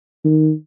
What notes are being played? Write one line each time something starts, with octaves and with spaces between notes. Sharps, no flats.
D#3